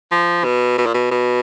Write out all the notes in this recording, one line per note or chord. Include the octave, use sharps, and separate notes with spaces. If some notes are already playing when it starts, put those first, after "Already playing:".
F3
B2
B2
A#2
B2
B2